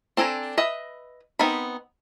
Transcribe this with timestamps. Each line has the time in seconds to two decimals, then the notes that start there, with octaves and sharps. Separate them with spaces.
0.17 C4 D4 A4 G#5 A#5
0.57 B4 D#5 E5
1.39 B3 C4 D#4 A#4 B5